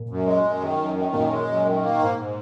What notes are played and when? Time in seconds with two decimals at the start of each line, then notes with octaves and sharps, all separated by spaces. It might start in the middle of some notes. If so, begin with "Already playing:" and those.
Already playing: A#2
0.09 F#2
0.26 G#3
0.44 F#2
0.61 D#3
0.78 F#2
0.96 D#3
1.14 F#2 A#2
1.30 G#3
1.47 F#2
1.65 D#3
1.83 A#3
1.99 G#2
2.16 G#2